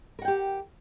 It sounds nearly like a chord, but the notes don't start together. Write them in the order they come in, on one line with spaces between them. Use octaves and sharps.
A#4 F#5 G5 G4